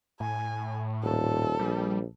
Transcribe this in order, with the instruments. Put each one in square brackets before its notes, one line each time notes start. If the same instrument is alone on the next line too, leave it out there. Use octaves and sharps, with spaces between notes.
[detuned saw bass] A2 [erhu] G#5
[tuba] D#1 [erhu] A4
[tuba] A#1 [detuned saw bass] G3